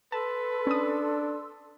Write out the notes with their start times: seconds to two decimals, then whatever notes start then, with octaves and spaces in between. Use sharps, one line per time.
0.12 A4 B4 A5 C6 E6
0.67 C#4 D4 D#6